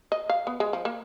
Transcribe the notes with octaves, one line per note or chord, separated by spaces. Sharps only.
D#5
F5
B3
G#3
F3
A#3